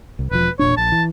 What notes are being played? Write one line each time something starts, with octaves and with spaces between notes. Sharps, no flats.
C2
E1 F3 B4
E1 A#2 D4 C#5
A#1 A5
E3